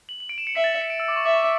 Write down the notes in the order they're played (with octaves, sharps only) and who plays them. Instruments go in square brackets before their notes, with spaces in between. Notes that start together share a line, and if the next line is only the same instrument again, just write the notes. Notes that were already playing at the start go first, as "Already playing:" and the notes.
[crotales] F#7
F#7
D7
E7
C#7
[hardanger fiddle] E5 [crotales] B6
[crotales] A6
B6
C#7
D7
E6
D6
C#6
[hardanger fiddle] E5 [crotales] D6
[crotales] C#6
D6